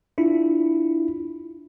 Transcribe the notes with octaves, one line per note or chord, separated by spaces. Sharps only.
D4 E4 F4